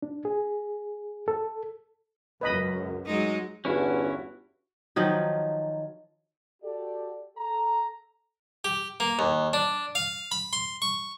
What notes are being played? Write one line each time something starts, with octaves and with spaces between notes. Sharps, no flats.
D4
G#4
A4
C#2 F#2 B4 D#5 B5
F#3 G#3 D#4
G1 E2 G2 C#4 E4 F#4
D#3 F3 F#3 D#4
F#4 G4 A4 D5
A4 A#5
G4
A#3
D#2
D4
F5
B5
C6
C#6